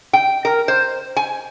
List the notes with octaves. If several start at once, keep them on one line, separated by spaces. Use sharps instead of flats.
G5
A#4
C5
G#5